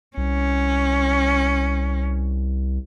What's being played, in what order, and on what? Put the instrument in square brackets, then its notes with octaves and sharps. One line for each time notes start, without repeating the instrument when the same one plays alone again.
[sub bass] C2 [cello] C#4